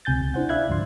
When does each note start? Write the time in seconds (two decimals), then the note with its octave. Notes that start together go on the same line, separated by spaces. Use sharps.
0.05 C#2 C3 G#5 G6 A6
0.21 C#2
0.34 D4 E4 C5 F#5
0.49 D5 E5 F5 B5 F#6 G#6
0.68 D2 G#2 D3 F3 C6